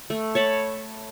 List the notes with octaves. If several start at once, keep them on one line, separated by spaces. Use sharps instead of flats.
A3
C#5 A5 B5